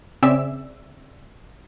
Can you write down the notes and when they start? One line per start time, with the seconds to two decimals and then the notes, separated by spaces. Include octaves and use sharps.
0.23 C#3 C4 G#4 D5 E5 E6